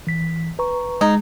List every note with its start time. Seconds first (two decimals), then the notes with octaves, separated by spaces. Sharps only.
0.07 E3 B6
0.59 B4 A#5 C#6
1.01 G#3 D#4 G#6